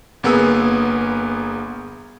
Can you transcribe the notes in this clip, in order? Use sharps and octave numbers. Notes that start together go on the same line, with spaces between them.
G1 A#3 B3 G#4 E6